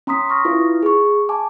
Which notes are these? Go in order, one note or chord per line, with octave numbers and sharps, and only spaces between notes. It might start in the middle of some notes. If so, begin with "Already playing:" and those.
C#4 A#5 C6 D#6 B6
C#6 D#6 F6 A#6
E4 F4 B4
G#4 C#6
G#5 A5 D6